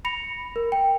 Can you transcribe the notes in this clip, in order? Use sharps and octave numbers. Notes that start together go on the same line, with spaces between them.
B5 A#6 C#7 F7
A#4
G5